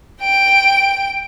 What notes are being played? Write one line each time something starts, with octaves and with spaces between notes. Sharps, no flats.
G5 D7